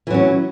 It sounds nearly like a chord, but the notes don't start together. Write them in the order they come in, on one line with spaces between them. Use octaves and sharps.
E3 F#3 C#4